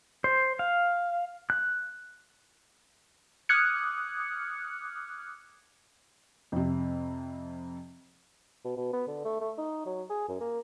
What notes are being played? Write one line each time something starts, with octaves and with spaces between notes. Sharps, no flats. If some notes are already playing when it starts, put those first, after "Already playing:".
C5
F5
F#6
D6 D#6 F6 F#6 G#6 C#7
F2 C3
B2
B2
B3
D3
A3
A3
D#4
F#3
G#4
F#2
A#3